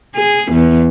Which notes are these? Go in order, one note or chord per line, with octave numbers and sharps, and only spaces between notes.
G#4
E2